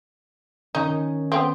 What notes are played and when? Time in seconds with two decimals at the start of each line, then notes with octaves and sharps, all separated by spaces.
0.75 D#3 C#4 D#4
1.32 B3 C4